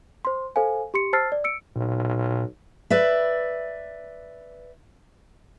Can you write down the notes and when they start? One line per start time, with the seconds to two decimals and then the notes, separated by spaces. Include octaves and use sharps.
0.25 C5 C6
0.56 A4 C5 F5 G#5
0.94 G4 C6 C#7
1.13 C5 A5 E6 F6 A6 C7
1.32 D5
1.44 E6 C#7 D7
1.76 B1 A#2
2.90 B4 D5 E5